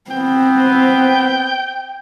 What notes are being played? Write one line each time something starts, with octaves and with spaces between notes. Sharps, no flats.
B3 C4 G5